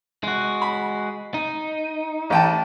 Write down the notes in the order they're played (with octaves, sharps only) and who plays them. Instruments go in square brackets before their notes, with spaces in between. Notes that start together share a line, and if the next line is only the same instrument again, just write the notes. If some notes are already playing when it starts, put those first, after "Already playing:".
[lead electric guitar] G#3 F#4
[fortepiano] B5
[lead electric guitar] D#4
[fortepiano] A1 G5 A5